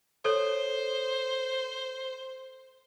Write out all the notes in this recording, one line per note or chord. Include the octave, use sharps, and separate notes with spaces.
A4 C5 C#5